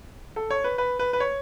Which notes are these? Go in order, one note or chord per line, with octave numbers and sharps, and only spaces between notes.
A4
C#5
B4
B4
B4
B4
C#5